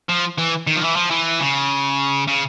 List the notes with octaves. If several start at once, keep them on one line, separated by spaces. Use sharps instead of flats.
F3
E3
D#3
F3
E3
F3
E3
C#3
C#3